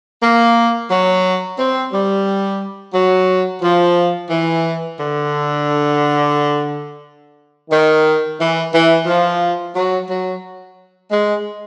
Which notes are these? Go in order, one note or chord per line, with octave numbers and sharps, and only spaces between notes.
A#3
F#3
C4
G3
F#3
F3
E3
D3
D#3
E3
E3
F3
F#3
F#3
G#3